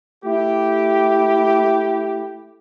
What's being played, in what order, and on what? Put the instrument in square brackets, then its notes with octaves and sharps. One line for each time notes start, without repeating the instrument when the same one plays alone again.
[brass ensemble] A3 E4 G4